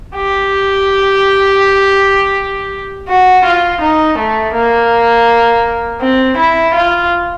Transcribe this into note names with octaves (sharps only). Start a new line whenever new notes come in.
G4
F#4
F4
D#4
A3
A#3
C4
E4
F4